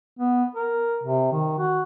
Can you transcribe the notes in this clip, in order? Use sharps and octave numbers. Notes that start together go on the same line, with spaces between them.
B3
A#4
C3
D#3
F#4